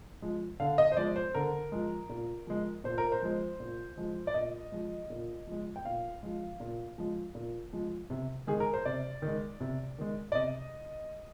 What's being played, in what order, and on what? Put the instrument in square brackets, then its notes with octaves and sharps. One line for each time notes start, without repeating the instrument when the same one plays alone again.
[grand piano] F3 G#3
D3 F5
D#5
C5
F3 G#3 D5
C5
D3 A#4
F3 G#3
A#2
F3 G#3
A#2 C5
A#4
C5
F3 G#3
A#2
F3 G#3
D5
A#2 D#5
F3 G#3
A#2
F3 G#3
G5
A#2 F5
F3 G#3
A#2
F3 G#3
A#2
F3 G#3
C3
D#3 G#3 G#4
A#4
C5
C3 D5
D#3
G#3
C3
D#3 G#3
D5
C3 D#5